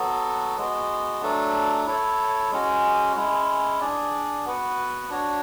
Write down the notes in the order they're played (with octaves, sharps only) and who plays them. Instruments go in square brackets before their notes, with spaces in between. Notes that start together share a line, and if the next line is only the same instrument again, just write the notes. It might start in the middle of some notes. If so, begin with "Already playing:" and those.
Already playing: [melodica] F#3 B3 F#4 A4
G#3 B3 F#4
F#3 A3 D4 A4
E4 A4 C#5
G#3 C#4 F#4
G#3 C#4 E4
D4 G#4 D5
B3 F#4 B4 F#5
D4 F#4 C#5